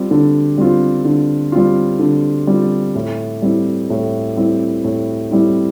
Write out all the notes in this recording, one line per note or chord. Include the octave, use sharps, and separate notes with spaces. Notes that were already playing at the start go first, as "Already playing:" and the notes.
Already playing: G3 C4 F4
D3
G3 C4 F4
D3
G3 C4 F4
D3
G3 C4 F4
A2
G3 C4 E4
A2
G3 C4 E4
A2
G3 C4 E4